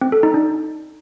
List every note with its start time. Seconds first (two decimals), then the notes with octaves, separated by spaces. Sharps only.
0.01 C4
0.12 A4
0.23 D#4
0.34 D4